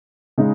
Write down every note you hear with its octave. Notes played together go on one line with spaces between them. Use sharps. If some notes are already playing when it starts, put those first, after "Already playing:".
C#3 G#3 D#4